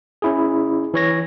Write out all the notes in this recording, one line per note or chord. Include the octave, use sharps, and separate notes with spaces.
C#4 E4 G#4
E3 C#5 A#6